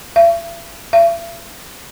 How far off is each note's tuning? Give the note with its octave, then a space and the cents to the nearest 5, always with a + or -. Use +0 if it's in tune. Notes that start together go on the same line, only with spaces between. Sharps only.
E5 +45
E5 +45